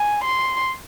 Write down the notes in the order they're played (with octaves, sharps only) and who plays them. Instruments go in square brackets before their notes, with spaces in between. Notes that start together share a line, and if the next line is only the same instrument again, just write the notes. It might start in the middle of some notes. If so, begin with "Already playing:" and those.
Already playing: [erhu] G#5
C6